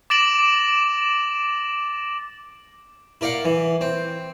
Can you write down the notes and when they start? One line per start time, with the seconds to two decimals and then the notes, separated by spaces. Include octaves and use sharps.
0.10 D6 A6 A#6 D7 E7 F#7
3.21 E4 A#4 D5 F5 F#5
3.45 E3
3.81 C4